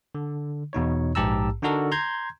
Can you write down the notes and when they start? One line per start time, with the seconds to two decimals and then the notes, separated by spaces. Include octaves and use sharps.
0.15 D3
0.73 E2 B2 D#4 C#5
1.15 A#1 G#2 G4 A5 A#5 E6
1.63 D3 D4 D#4 F#4 A4 A#4
1.92 A#5 C6 G6 G#6